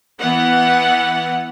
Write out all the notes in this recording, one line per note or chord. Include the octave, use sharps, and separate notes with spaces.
E3 B3 F#5